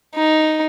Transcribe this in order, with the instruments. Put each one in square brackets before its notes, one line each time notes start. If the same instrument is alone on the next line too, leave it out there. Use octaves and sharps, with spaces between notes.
[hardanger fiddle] D#4